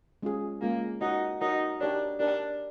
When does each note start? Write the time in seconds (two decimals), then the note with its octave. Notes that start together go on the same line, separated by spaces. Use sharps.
0.22 G#3 C#4 F4 G#4
0.61 G#3 A#3 C#4 F4 G#4
1.01 D#4 F#4 A#4 C#5 F#5
1.41 D#4 F#4 A#4 C#5 F#5
1.81 D4 D#4 G4 A#4 C#5
2.20 D4 D#4 G4 A#4 C#5